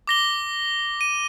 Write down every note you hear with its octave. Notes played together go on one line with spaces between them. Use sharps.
D6 A#6 G7
D#7